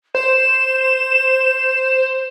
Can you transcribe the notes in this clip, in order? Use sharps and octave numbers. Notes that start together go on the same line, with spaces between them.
C5 E7